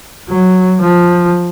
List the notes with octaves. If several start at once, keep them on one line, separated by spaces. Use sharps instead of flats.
F#3
F3